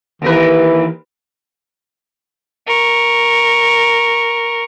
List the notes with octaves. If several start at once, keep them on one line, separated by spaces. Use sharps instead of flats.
D#2 E3 A#4 B4
A#4 C#6